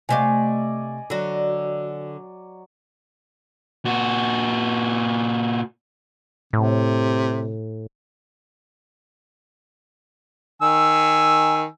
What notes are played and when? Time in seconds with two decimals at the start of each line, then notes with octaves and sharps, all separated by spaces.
0.09 C3 A3 D5 D#5 F5 G#5
1.10 D3 F#3 F#4
3.85 A#2 F#4
6.53 A2 C3
10.62 D#3 G#5 E6